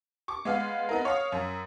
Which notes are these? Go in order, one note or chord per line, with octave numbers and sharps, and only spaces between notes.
C#6 D6
G#3 B3 F5
B3 D#4 A#4
C#5 F5 D#6
F#2